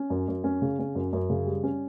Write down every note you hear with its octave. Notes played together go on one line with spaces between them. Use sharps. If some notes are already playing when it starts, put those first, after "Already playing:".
Already playing: C#4
F#2
F#2
C#4
C#3
C#4
F#2
F#2
C#3
G3
C#4